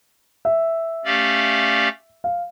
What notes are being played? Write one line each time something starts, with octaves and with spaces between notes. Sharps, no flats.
E5
A3 C#4 G4 D5 F5
F5